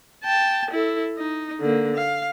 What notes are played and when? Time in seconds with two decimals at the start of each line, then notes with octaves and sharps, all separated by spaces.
0.24 G5 A5
0.71 E4 A4
1.17 D#4
1.61 D3 A#3
1.96 F5